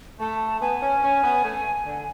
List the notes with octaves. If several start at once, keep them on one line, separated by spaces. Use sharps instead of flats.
A3 A5
B3 G#5
C#4
C#4
B3
A3
D3